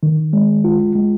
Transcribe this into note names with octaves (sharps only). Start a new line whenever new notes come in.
D#3
G#3
F4
G#3